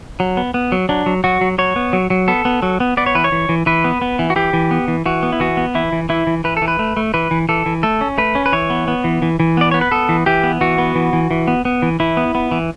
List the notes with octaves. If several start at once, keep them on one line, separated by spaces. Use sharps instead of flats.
F#3
B3
B3
F#3
F#3 D4
F#3
F#3 F#4
F#3
F#3 C#5
B3
F#3
F#3
B3 A4
B3
F#3
B3
B3 D5
C#5
E3 B4
C#5
E3
E3
E3 B4
B3
B3
E3
F#4
E3 G4
E3
B3
E3
E3 F#4
B3
E4
E3 F#4
B3
E3 E4
E3
E3 E4
E3
E3 B4
A4
E3
B4
A3
A3
E3 B4
E3
E3 A4
E3
A3 A4
C#4
A3 B4
C#4
B4
E3 C#5
B3
B3
E3
E3
E3
B3 D5
B3 C#5
B4
B3 A4
E3
E3 G4
B3
E3 F#4
B3
E3
E3
E3
B3
B3
E3
E3 E4
B3
B3
E3